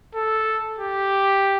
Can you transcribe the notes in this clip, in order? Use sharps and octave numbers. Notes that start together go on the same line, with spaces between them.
A4
G4